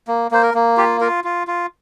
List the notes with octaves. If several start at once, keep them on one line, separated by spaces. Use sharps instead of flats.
A#3
A#3 C5
A#4
A#3
F4 G4
F4 A#4
F4
F4